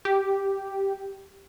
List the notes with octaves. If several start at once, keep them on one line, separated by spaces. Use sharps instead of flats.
G4